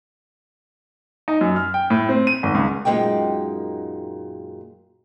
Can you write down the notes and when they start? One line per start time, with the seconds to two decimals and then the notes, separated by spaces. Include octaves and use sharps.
1.28 D#4
1.41 F#2
1.56 F6
1.74 G5
1.90 A2
2.09 C4
2.27 D#7
2.43 G#1
2.55 C#2
2.85 F#2 A#2 G#3 D#4 G5